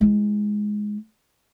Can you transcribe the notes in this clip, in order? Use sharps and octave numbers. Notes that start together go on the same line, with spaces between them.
G#3 E4